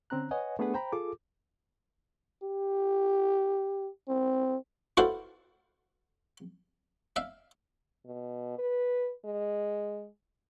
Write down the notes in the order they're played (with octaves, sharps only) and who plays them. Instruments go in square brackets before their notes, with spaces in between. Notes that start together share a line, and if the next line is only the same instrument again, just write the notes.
[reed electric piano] D3 C4 C#4 A#5 F#6
B4 C#5 D#5 F#5 G#5
A3 B3 D4 G#4 B4 F#5
C5 G5 A#5 B5
F4 G#4 A4 D6
[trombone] G4
C4
[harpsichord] E4 F#4 A4 B4 C5 F5
E5 F5
[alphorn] B2
B4
G#3